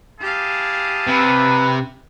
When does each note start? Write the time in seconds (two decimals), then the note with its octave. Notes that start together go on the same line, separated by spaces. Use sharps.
0.20 E4 G4 G#4 F5 A5
1.08 C3 B4